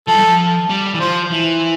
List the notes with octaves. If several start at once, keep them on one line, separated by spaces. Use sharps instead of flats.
F3 A4
G3
F3
G3
E3
F3 C5
E3